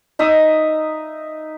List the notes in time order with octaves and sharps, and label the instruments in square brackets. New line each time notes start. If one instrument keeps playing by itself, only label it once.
[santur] D#4 E5 D#6